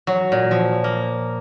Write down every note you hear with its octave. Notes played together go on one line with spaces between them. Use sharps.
F#3
A#2
F3
A#3